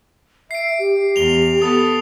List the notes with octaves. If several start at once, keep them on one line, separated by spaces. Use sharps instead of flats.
E5 C7 D7
G4
E2 F7 G7
B3 A4 D#6